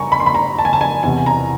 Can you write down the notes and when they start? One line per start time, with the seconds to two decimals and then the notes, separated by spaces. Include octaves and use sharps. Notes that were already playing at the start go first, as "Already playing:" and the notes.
Already playing: G2 G#5 A#5 C#6
0.12 B5
0.20 C6
0.26 B5
0.35 A#5
0.59 A5
0.65 G#5
0.73 A5
0.81 G#5
1.03 E2 C3 E3 G#5
1.26 A#5